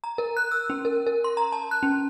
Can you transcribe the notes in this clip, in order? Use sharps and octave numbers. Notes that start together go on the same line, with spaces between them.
A#5
A#4
F#6
E6
C#4
A#4
A#4
C6
A#5
A5
F#6
C#4